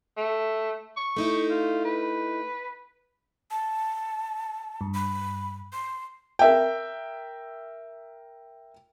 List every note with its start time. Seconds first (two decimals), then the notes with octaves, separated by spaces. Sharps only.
0.17 A3
0.97 C#6
1.17 A3 D#4 E4
1.50 F4
1.85 B4
3.51 A5
4.81 G2
4.94 B5
5.73 C6
6.39 A#4 E5 G5